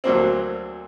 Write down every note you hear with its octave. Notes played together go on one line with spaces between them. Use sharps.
D2 F#3 A#3 C4